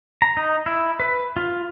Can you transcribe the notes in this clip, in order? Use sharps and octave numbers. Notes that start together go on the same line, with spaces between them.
A#5
D#4
E4
B4
F4